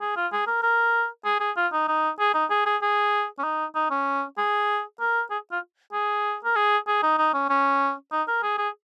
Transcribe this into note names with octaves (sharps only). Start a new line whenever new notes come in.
G#4
F4
G#4
A#4
A#4
G#4
G#4
F4
D#4
D#4
G#4
D#4
G#4
G#4
G#4
C#4
D#4
D#4
C#4
G#4
A#4
G#4
F4
G#4
A#4
G#4
G#4
D#4
D#4
C#4
C#4
D#4
A#4
G#4
G#4